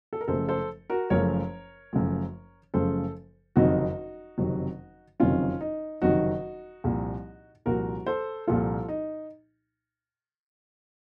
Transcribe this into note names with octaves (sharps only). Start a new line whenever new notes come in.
A4
A#4
F#1 F#2 C#3 F3 A3 A4 C5
A4 C5
F#4 A#4
F#1 F#2 C#3 F3 A3 A#4 C#5
F#1 F#2 C#3 F3 A3
F#1 F#2 C#3 F3 A3 A4 C5
F#1 F2 C3 D#3 F#3 D#4 F#4
F#1 F2 C3 D#3 F#3
F#1 F2 C3 D#3 F#3 C#4 F4
D#4
F#1 F2 C3 D#3 F#3 D#4 F#4
C2 A#2 F3
C2 A#2 F3 F#4 A#4
A4 C5
C2 A#2 F3 F4 A4
D#4